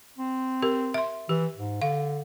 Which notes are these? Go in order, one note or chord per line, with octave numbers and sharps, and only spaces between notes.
C4
G4 A#4
E5 C6
E3 G4
G#2
D3 F5